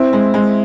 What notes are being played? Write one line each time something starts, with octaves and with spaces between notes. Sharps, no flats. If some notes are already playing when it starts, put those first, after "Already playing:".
Already playing: C4 E4
G#3
G#3